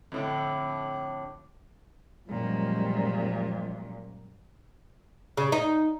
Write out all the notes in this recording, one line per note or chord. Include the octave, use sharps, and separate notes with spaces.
F2 A2 D3
F#2 A#2 F3 G3 G#3
C#3
D#4